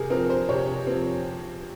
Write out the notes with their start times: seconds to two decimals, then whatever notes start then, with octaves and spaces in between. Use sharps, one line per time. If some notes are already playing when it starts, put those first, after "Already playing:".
Already playing: C3 G#4 A#4
0.10 F3 C4 A#4
0.30 C5
0.49 C3 C#5
0.87 F3 C4